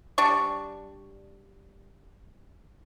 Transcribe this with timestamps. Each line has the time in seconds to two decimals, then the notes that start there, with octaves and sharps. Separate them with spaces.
0.18 G3 D4 C#6